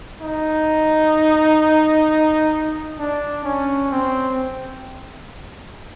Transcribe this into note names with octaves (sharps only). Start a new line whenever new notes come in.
D#4
D4
C#4
C4